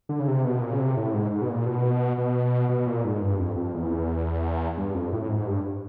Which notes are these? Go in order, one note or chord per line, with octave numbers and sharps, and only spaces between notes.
D3
C#3
C3
B2
A#2
C#3
C3
A2
G#2
G#2
B2
A#2
B2
B2
B2
A#2
G#2
G2
F2
F2
E2
G2
F2
A2
G#2
G2